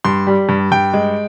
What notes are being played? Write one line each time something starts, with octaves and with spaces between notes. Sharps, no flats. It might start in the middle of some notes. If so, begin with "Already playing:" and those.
G2 C6
G3
G2
G2 G5
G#3